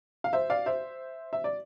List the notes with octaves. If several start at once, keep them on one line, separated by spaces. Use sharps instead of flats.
F5
C5 E5
D5 F5
C5 E5
E5
D5